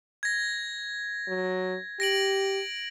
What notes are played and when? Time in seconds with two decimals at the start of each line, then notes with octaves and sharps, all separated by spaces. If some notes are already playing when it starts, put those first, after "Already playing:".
0.23 G#6 A#6
1.28 F#3
2.00 G4 A#6 D7 F#7